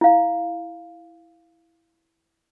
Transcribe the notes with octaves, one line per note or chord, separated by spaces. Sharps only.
E4 F5